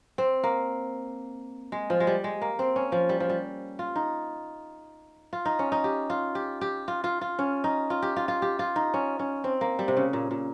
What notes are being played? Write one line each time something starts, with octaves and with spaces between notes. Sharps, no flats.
C4
A#3
G#3
F3
G#3
G3
G#3
A#3
C4
C#4
F3
G3
F3
G3
F4
D#4
F4
D#4
C#4
D#4
G4
F4
G4
G4
F4
F4
F4
C#4
D#4
F4
G4
F4
F4
G4
F4
D#4
C#4
C#4
C4
A#3
G3
C3
C#3
A#2
A#2